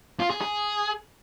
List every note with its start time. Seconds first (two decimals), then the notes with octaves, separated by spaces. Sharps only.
0.20 F4
0.30 G#4
0.41 G#4